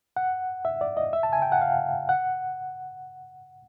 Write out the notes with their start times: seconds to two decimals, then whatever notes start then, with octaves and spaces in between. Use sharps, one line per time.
0.17 F#5
0.65 E5
0.81 D5
0.97 D#5
1.13 E5
1.23 A5
1.33 G#5
1.42 G5
1.52 F#5
1.61 F5
2.09 F#5